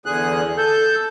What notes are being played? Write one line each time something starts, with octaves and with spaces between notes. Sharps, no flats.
E2 D3 G#4 F#6
A4 G6